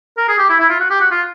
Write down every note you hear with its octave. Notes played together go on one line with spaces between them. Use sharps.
A#4
G#4
G4
E4
E4
F4
F#4
G4
F#4
F4